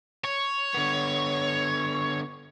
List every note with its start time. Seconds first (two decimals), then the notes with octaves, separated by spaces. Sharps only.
0.24 C#5
0.74 D3 B3